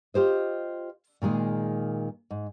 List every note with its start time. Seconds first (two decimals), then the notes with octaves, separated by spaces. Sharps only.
0.14 F4 G4 C5 D#5
1.22 A#2 D#3 G#3 G#4
2.31 G#2